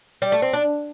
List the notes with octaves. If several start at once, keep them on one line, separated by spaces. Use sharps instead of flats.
G3
A3
C4
D4